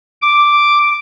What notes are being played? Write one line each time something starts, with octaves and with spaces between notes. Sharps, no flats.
D6